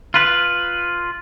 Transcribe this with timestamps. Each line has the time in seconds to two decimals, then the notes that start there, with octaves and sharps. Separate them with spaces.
0.14 F4 B4